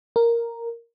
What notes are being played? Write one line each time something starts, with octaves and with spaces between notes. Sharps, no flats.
A#4